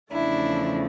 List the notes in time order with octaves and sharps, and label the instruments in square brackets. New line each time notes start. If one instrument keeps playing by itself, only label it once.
[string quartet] E2 C#3 F3 A3 D4 E4